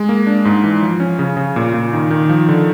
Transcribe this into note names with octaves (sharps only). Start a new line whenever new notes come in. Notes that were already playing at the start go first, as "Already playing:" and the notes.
Already playing: G#3
A#3
D4
G#2
E3
F3
C#4
C#3
C#3
A#2
A#2
D#3
D#3
F3
D3